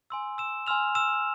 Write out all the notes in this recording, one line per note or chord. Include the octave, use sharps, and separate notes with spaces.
G#5 C6 E6
E6 E7
G#5 C6 E6 F6 F7
E6 E7